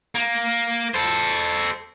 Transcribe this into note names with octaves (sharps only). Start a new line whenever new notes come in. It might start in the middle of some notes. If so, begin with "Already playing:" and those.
A#3
A4 C5